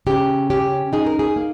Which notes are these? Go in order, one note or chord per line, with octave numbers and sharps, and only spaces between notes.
C#3 G4
C#4 G4
D#4 G#4
A#4
G#4
A#3